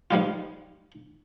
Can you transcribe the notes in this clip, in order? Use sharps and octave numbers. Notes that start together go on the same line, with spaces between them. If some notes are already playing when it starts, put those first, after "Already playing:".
G#2 F3 G3 F4